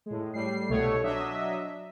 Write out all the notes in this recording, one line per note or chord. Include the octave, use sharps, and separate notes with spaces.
A2 G#3
A2 G3 C7
C2 B2 A3 C#5
F#3 D4 D#5 E5